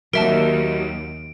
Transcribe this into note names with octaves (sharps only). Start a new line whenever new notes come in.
D#2 F#3 F#4 A#4 E5 A5 D7